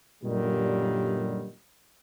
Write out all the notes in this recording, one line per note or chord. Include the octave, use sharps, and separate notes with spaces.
F#2 A#2 D3 D#3 G3